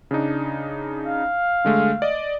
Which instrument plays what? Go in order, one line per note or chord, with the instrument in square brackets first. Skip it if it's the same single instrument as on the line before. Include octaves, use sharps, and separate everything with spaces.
[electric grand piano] C#3 D4 D#4
[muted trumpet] F5
[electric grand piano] D3 G#3 A3
D5 D#5